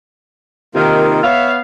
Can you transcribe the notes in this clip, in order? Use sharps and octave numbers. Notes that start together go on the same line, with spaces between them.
C3 D#3 A#3 F4
B3 C#5 E5 F5